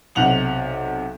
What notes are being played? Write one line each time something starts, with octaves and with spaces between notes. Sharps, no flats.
B1 C3 F#5 F7 F#7